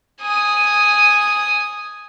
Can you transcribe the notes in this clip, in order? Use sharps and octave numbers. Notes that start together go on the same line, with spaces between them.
G#5 D#6